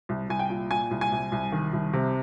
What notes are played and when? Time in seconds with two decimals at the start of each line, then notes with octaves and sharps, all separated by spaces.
0.09 C2
0.29 C2 G#5
0.39 G5
0.50 A#2
0.71 A#2 G#5
0.91 C2
1.01 G#5
1.12 C2
1.32 C2
1.52 D#3
1.73 C2
1.93 C3